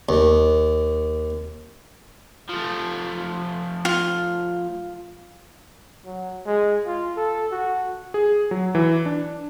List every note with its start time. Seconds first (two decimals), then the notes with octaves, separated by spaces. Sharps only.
0.09 D#2
2.49 F3 A3
3.85 F4
6.06 F#3
6.46 G#3
6.87 F4
7.17 A4
7.52 F#4
8.14 G#4
8.51 F#3
8.75 E3
9.06 D4